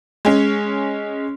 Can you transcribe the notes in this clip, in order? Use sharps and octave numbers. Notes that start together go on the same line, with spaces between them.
G#3 C#4